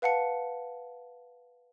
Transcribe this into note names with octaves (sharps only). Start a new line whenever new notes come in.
B4 F5 F#5 A5 C#7